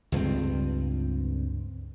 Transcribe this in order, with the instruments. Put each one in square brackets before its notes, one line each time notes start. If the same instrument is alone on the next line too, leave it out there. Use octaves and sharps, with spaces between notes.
[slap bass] C#2 G2 G#3 C4